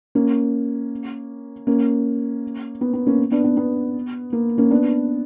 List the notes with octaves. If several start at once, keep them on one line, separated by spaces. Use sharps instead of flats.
A#3 C#4
A#3 C#4
B3
B3
A#3 C#4
B3 D4
B3
B3
A#3
A#3 C#4
B3 D4